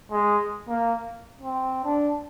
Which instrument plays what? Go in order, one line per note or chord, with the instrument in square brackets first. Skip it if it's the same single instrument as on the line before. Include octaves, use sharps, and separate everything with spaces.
[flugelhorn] G#3
A#3
C4
D4